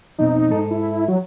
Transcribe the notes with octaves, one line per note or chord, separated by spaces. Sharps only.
F2 B2 C4 D#4
G#2 A4
E4
F#3